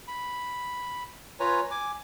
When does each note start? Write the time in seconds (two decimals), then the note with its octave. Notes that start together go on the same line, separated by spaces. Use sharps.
0.08 B5
1.40 F4 B4 C#5 G#5 A#5
1.71 G#5 D6